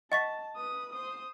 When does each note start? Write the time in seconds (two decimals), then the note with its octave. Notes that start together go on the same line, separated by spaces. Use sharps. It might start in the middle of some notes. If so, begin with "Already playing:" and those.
0.12 D#5 F#5 A5 C#6 B6
0.56 B4 D#6
0.93 C5 D#6